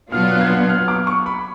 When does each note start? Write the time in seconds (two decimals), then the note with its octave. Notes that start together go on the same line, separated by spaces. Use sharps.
0.11 B2 F#3 B3 D4 F4 F6
0.31 F#6
0.41 G#6
0.50 F#6
0.69 F6
0.88 D6
1.07 C#6
1.26 B5